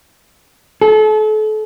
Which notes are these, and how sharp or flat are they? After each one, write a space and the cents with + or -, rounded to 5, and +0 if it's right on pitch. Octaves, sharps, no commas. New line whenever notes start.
A4 -35